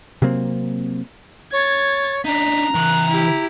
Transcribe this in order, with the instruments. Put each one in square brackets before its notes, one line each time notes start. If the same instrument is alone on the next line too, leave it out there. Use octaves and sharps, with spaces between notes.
[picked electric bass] C3 F#3 A#3 C4
[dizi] C#5 [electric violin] G#6 A6
[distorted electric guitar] D4 D#4 [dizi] A#5 [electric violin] B6
[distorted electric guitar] E3 A#4 [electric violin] F#6
[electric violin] E4 G4